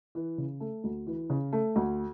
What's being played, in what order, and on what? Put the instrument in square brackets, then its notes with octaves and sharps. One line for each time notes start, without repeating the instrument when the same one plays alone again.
[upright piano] E3
C#3
A3
D2
E3
C#3
A3
D2